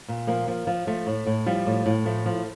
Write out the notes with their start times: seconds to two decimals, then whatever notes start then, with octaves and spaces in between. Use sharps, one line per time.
0.08 A#2
0.27 F3 A#3
0.48 F3
0.67 F3
0.87 F3 A3
1.07 A2
1.27 A2
1.46 F3 G3
1.66 A2
1.86 A2
2.05 F3 A3
2.26 F3